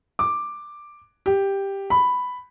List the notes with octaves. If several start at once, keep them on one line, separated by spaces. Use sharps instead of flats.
D6
G4
B5